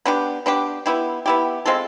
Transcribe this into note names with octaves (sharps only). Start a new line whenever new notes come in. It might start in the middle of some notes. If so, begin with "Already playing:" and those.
B3 D4 G4
B3 D4 G4
B3 E4 G4
B3 E4 G4
G#3 C4 F4 A4